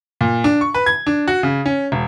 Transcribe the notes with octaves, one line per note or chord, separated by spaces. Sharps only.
A#2
D4
C#6
B4
G#6
D4
F#4
C#3
C#4
E1